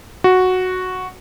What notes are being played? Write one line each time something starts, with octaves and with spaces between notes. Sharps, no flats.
F#4